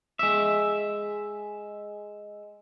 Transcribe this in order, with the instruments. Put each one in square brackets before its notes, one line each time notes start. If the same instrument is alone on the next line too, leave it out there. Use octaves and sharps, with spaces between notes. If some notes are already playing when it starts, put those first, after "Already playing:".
[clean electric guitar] G#3 E5